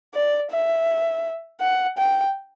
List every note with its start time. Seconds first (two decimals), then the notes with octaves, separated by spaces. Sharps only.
0.14 D5
0.51 E5
1.61 F#5
1.98 G5